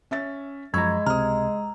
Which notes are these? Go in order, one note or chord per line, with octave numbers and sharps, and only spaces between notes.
C#4 E5 A6
F#2 F3 G#3 A#5 B5 C#6 E6 G#6
C#2 C3 A#5 D#6 F6